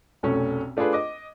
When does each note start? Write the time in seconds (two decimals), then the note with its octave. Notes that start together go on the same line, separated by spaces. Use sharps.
0.23 F1 B1 A3 C#4
0.77 A3 D4 F4 G#4 B4
0.93 D#5 D6